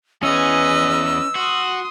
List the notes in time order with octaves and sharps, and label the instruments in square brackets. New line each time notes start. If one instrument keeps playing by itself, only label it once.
[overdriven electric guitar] E2 G#4 [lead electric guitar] C#4 [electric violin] B4 D#5 [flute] E6
[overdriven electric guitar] F#4 [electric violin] C6 D#6